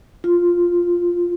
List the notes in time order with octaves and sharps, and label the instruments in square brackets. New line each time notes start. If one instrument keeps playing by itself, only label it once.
[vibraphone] F4